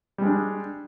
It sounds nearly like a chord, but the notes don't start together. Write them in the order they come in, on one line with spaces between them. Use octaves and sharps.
G3 G#3 D4